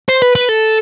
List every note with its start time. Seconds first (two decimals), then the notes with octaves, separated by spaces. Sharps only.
0.09 C5
0.22 B4
0.35 B4
0.49 A4